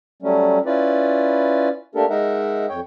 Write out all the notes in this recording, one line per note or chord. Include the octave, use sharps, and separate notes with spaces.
F#3 G3 A3 C#4
C#4 E4 F4 B4 D5
A3 A#3 D4 G4 A4 A#4
G#3 D#4 A#4 E5 F#5
F2 C#5 G5